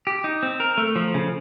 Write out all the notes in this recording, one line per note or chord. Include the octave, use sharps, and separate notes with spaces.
G4
D#4
C4
A#4
A3
F3
C#3